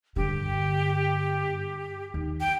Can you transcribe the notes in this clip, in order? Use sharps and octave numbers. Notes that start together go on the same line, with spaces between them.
G2 D3 G4
D#2
G5